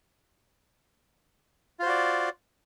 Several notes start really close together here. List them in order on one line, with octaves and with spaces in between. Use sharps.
F4 C5 F#4 D5